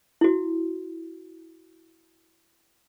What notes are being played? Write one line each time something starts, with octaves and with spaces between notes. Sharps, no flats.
E4 F#4